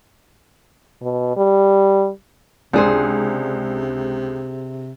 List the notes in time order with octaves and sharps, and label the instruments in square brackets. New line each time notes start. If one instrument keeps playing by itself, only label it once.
[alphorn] B2
G3
[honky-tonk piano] C#2 [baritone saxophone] C3 [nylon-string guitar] D4 G#4 C5